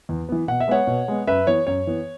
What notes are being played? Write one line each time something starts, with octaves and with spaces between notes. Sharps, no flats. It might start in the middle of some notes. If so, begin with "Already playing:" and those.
E2
E3 B3
B2 F#5
E5
G#3 B3 C#5 F#5
B2
G#3 B3
F#2 B4 E5
E3 B3 C#5
F#2 C#5
E3 B3